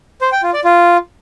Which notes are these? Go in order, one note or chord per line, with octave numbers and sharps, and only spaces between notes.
C5
G5
F4
D5
F4